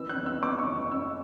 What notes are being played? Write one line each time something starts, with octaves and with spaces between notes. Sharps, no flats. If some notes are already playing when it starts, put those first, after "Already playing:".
Already playing: E3 E6
F#6
E2
E6
B3 D6
C#6
E2
E6
C#3 E6